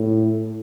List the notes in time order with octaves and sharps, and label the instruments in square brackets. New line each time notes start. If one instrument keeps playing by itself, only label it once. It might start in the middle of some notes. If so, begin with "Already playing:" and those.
Already playing: [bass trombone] A2